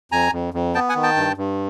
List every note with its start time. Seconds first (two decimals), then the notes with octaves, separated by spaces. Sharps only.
0.12 F2 G#5 A#5
0.32 F2
0.54 F2
0.75 B3 G5 A5
0.89 F#5 G#5
0.96 D#3
1.03 G5 A5
1.16 G2
1.37 G2